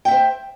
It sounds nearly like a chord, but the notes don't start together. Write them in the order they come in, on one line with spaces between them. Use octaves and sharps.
G5 E5 C5